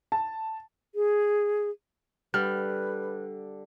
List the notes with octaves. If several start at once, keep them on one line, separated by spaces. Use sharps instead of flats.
A5
G#4
D3 G3 B4 F6